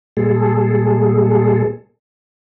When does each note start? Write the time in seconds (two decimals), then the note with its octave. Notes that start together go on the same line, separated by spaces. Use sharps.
0.17 A#2 G3 G#3 G#4 A4